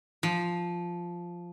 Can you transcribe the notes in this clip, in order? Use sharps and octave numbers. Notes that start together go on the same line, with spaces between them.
F3